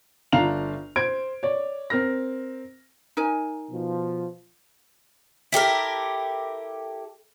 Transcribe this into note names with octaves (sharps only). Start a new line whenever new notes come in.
G1 D4 F4 F5 A#5 F7
C5 G#6 D7
C#5 D5
C4 A#4 F6 A#6
D#4 A#4 G#5
B2 F3
E4 G4 A4 A#4